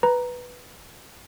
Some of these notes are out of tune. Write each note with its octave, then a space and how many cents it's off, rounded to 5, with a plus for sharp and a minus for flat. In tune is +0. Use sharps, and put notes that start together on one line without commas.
B4 +0 A#5 +5